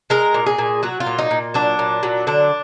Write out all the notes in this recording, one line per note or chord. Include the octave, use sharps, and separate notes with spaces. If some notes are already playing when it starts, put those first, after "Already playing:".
G#3 A#4
A#2
G#4
A#2
F#3 F#4
F4
A#2
D#4
A#2
F#3 D4
A#2
F#3
D3 D4